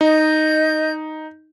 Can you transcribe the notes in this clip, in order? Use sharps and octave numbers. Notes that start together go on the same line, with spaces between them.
D#4 D#5 G6